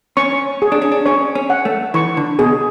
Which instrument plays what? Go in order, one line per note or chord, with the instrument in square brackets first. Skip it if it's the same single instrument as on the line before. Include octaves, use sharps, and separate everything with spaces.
[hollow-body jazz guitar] C#4 [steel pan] C#6
[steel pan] G#4
[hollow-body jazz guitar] D4
C#4
D4
[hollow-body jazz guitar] C#4 [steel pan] C#5
[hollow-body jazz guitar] C#4
[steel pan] F#5
[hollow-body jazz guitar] A3
[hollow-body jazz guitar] E3 [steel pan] C#6
[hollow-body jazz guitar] D3
[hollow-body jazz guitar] B2 [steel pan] G#4